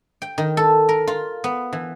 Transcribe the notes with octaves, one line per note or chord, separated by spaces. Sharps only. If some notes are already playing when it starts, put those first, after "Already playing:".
G5
D#3
A4
A#4
F4
B3
E3